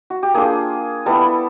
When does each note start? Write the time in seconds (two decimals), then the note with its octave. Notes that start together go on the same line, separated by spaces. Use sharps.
0.10 F#4
0.23 G4
0.34 A#3 D4 F4 G#4
1.06 G3 B3 E4 A4